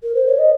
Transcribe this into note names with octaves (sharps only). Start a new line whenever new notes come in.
A#4
C5
C#5
D#5